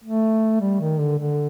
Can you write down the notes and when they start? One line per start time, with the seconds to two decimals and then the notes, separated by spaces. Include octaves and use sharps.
0.04 A3
0.61 G3
0.80 D#3
1.00 D3
1.19 D3